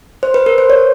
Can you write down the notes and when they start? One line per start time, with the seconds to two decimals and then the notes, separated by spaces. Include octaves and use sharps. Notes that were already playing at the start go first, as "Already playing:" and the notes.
0.23 C5
0.34 B4
0.46 A#4
0.58 C5
0.70 C#5